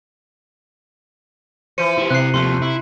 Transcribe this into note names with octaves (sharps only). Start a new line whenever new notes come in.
E3 F3 C5 C#7 D#7
E4 G4
C3 F#6 C7
D#2 F3 A3 C6
E4